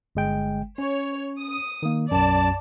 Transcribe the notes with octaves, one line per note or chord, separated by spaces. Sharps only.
G1 G#3 G5
C#4 C#5
D#6
D#3 A#3
B1 F#2 D5 A5